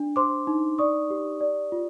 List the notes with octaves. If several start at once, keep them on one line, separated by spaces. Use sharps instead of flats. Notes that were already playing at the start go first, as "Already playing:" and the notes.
Already playing: D4
C5 C6 D6
D#4
D5 C#6 D#6
G4
D5
F4